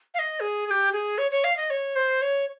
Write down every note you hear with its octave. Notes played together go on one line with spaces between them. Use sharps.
F5
D#5
G#4
G#4
G4
G#4
C#5
C#5
F5
D#5
C#5
C5
C#5